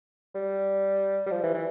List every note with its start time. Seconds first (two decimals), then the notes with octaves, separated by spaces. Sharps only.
0.35 G3
1.26 G3
1.31 F3
1.44 E3
1.54 E3